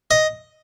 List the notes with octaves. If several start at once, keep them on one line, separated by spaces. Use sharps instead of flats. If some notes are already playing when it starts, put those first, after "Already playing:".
D#5